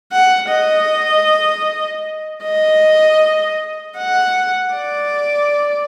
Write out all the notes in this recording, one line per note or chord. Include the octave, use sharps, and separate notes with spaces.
F#5
D#5
D#5
F#5
D5